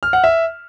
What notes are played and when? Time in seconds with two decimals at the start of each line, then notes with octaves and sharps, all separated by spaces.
0.03 F6
0.13 F#5
0.24 E5